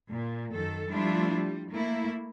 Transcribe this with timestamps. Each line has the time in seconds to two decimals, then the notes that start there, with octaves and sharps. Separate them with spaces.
0.12 A#2
0.53 F#2 D#3 A4
0.90 F3 G3 A3 D4 E4 F4
1.35 G3
1.71 A3 A#3 E4